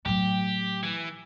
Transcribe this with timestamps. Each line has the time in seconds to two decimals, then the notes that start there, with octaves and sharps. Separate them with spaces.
0.06 A2 F#3 G4
0.83 E3